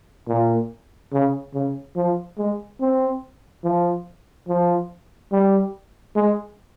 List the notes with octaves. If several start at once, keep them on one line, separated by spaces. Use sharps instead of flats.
A#2
C#3
C#3
F3
G#3
C4
F3
F3
G3
G#3